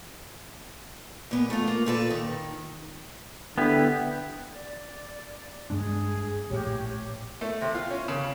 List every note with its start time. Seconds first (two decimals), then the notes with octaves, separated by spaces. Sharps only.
1.31 A#2 B3
1.50 A3 F4
1.68 A#3
1.86 A#2 A4 B4
2.10 D#3
3.58 D3 B3 E4 G4
4.51 D5
5.70 G2 G#3 D4 G#4
6.50 A#1 A2 G4 C#5
7.41 A3
7.61 C3
7.74 F4
7.91 C#4
8.08 C#3